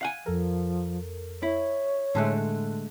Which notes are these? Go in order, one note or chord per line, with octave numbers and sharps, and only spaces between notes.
F5 F#5 G#5
F2 F3 A4 A#4
E4 C#5
A2 D3 G#3 A3 A5 F#6